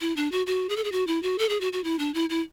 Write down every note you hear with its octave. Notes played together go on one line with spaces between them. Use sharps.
E4
D4
F#4
F#4
G#4
A4
G#4
F#4
E4
F#4
A4
G#4
F#4
F#4
E4
D4
E4
E4